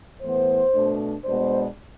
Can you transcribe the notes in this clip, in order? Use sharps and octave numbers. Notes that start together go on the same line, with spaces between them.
A2 E3 B3 C5
B2 A3 D4
B2 G#3 B3 D4 C5